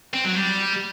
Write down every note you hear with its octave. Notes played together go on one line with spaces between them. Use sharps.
C4
F#3
G3